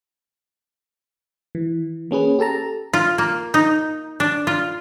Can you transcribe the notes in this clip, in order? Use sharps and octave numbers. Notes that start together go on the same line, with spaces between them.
E3
A#3 C#4 G#4 B4
G4 A4 A5 A#5
F4
A#3
D#4
D4
F4